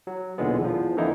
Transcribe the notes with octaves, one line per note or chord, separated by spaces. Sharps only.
F#3
B1 E2 A#2 D3 G#3 B3
E2 F3
F2 D3 E3 A#3 D#4 E4